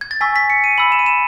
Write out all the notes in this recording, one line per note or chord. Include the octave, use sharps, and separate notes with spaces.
G#6
A6
G#5 C#6 E6 B6
B6
C#7
D#7
B5 E6 F#7
E7
D#7
E7